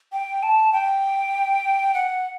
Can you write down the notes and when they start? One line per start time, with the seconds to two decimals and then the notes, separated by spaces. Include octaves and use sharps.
0.12 G5
0.43 A5
0.73 G5
1.94 F#5